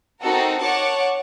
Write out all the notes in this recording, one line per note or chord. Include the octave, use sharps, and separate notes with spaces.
C4 D#4 F#4 A4 A#4
C#5 F#5 A5 C#6 D6